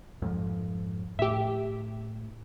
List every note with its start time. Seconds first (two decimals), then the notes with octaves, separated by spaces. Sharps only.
0.22 F2 G#2 F3
1.19 A2 G4 E5